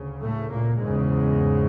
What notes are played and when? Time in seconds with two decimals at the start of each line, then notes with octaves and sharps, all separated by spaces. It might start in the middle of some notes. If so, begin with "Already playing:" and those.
Already playing: D2 C#3
0.21 A2 A3
0.50 A#2 A#3
0.80 E2 G#2 C#3 G#3